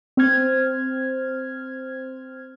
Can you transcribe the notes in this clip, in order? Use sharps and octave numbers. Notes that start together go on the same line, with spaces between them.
C4 C5 F6 G#6